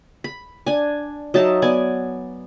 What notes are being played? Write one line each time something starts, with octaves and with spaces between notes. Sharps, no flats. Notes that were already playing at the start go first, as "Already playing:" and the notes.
B5
D4 G#5
F#3 D#4 E5 A5
B3 D5 G#5